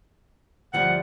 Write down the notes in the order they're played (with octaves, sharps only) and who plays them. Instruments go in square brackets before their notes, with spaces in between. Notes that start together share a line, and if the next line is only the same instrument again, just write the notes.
[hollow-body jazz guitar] D2 F3 G3 [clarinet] F#5